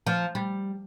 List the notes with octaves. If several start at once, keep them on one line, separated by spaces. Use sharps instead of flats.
F3
G3